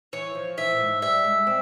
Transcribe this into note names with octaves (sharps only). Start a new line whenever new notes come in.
E3 C#5
F3
E3 E5
A#2
G#2
G3 E5
G#3
C4